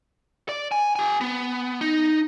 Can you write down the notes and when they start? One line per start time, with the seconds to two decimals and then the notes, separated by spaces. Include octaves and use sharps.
0.49 D5
0.72 G#5
0.96 G4 G#5
1.21 B3
1.81 D#4